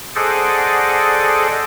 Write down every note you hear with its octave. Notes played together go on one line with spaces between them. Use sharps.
G#4 A4 C5 D5 D#5 F#5